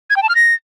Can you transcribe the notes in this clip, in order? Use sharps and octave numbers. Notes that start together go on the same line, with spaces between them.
G#6
G5
A5
F6
A#6